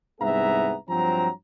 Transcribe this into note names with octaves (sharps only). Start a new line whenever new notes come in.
C2 G#2 B3 G#4 E5 A#5
G2 F3 F#3 C4 A#5